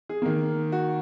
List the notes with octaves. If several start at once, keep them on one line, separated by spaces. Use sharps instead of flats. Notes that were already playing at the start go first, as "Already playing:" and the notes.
G#4
D#3 A#3
F#4